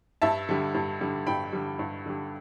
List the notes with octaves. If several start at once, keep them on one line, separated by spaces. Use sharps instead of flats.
G2 E5 A5
D3 G3
G2
D3 G3
G2 G5 B5
D3 G3
G2
D3 G3